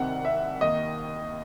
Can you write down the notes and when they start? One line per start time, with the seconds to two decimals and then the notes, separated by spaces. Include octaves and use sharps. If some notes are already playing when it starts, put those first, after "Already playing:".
Already playing: C2 C3 D#3 F#5
0.25 E5
0.61 D#2 D#3 D#5